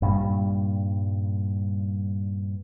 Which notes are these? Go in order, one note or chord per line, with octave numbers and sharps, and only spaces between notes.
G2 A#2 G3